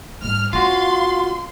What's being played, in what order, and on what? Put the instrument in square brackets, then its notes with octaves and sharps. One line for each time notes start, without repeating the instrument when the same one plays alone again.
[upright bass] G#2 G3 [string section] F6
[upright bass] C#4 [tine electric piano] F4 F#4 [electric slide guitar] F5 [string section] C6